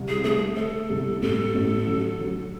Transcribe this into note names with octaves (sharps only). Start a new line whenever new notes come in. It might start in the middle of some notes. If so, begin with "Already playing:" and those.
Already playing: C2
G#4
A3 G#4
A3 A4
C2
A1 A4
A1
F#3
F#3